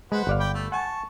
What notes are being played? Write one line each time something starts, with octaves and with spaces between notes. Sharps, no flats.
G#3 B4 C5 F#5
G1 D5 F5
G5 B5 D6
A3
F#5 G#5 A5 C#6